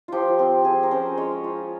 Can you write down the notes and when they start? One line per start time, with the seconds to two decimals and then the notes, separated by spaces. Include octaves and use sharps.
0.08 F3 F4 G4
0.39 C4
0.65 F3 G#4
0.83 A#4
0.91 C#4 C5
1.17 G#3 C#5
1.44 F4